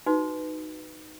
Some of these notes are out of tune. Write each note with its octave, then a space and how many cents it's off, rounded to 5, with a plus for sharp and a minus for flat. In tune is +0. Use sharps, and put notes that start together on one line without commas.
D#4 -5 F#4 +0 B4 +5